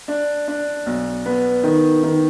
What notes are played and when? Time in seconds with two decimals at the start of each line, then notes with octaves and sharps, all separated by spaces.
0.08 D4
0.48 D4
0.86 B1
1.26 B3
1.64 D#3
2.03 D#3